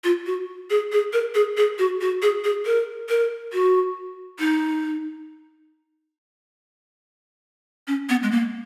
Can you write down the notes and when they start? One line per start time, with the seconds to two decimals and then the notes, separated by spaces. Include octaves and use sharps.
0.04 F4
0.26 F#4
0.70 G#4
0.92 G#4
1.13 A#4
1.35 G#4
1.57 G#4
1.79 F#4
2.01 F#4
2.22 G#4
2.44 G#4
2.66 A#4
3.09 A#4
3.53 F#4
4.39 D#4
7.87 C#4
8.09 B3
8.23 G#3
8.31 A#3